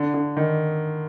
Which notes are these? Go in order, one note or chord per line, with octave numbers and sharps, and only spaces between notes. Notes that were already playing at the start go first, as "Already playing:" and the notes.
Already playing: D3
D3
D#3